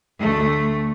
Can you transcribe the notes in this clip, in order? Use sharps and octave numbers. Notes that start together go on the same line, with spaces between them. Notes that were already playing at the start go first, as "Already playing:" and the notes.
D2 A3